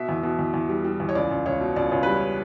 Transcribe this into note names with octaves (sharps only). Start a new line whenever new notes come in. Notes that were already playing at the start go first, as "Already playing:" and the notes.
Already playing: B2 E5
E2
B2
E2
E2
G3
G3
E2
C#5
C#2 D5
C#2
C#2 C#5
B2
C#2 D5
C#2 C#5
G3 B4
C#5